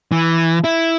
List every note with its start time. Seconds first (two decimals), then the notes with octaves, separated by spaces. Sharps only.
0.12 E3
0.64 E4